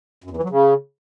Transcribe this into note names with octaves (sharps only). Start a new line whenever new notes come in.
F#2
E2
E3
F#3
C#3